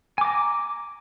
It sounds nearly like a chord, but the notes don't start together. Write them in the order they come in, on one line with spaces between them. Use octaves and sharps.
G#5 D6 A#5